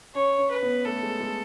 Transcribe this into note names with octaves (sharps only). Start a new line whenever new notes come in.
C#4 C#5
C#4
B4
B3
A3 A4
G#3
G#3